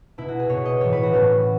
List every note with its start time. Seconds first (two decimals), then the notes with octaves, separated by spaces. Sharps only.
0.18 B2 E4
0.28 F#4
0.39 G#4
0.50 B2 C#5
0.65 D#5
0.81 A2 E3 C#5
0.92 B4
1.03 F#4
1.13 A2 E3 C#4